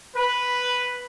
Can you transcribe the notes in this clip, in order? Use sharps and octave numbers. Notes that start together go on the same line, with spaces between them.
B4